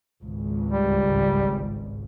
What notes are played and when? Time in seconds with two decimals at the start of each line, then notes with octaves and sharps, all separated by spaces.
0.22 G#1 C#2
0.72 G3